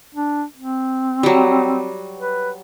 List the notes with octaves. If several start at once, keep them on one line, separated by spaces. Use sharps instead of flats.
D4
C4
F#3 G3
B4